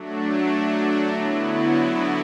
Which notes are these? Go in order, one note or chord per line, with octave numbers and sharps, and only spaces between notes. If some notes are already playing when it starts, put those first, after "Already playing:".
Already playing: F#3 A3 D4
D3 F#3 B3 E4